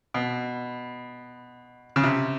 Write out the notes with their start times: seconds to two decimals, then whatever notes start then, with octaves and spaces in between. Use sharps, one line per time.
0.14 B2
1.96 C#3
2.03 C3